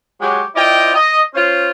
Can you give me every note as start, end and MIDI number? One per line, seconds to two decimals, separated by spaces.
0.21 0.43 54
0.21 0.43 56
0.21 0.43 67
0.21 0.43 73
0.55 0.93 60
0.55 0.93 64
0.55 0.93 65
0.55 0.93 74
0.55 0.93 75
0.55 0.93 79
0.94 1.21 75
1.35 1.70 61
1.35 1.70 65
1.35 1.70 72